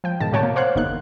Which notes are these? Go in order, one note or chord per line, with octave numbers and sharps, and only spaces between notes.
F3 G5
G#2 B2 D#3 A5
A2 C3 F#4 C#5 G5 A5
A#3
C5 C#5 F5 F#5 F#6
G1 E2 A#3 D#4 F#6